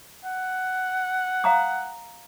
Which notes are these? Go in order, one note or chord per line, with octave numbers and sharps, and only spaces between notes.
F#5
F5 A#5 D#6